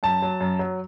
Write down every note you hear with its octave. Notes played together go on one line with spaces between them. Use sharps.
F#2 A5
F#3
F#2
F#3